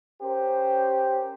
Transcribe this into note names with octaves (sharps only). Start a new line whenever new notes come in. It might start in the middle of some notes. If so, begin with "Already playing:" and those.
C#4 G4 A#4 C5